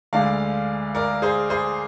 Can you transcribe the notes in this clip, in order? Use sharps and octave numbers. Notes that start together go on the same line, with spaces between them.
D2 D3 G#3 D5 F5
A#4 D5
G#4 C5
G#4 C5